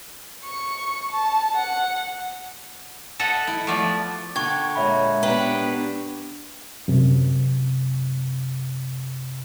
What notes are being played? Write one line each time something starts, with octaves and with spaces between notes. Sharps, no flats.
C#6
A5
F#5
A4 D#5 E5 F#5 A5
E4
F3 A3 B3 D5 E5
D3 G5 C#6 G#6
A#2 G#3 C#5 E5 B5
B3 D4 G4 B4 G5 A#5
F#2 C3